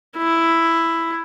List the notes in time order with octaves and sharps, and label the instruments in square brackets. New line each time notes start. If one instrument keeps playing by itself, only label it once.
[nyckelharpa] E4